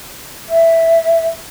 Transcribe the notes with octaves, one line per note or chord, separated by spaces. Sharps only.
E5